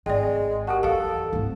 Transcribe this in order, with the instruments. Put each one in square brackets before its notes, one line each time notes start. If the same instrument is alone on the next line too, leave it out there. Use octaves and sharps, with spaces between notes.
[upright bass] G#1 [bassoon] G#3 [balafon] D5 G5
[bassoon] F#4 [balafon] G4 A#4 A5
[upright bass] E2 [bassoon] A4 [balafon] F5 A5
[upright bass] G#1 C3